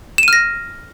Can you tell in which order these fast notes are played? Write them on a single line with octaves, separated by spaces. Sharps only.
E7 D#7 F6 A#6